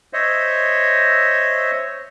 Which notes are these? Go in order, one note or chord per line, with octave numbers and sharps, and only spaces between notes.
C5 C#5 D#5 E5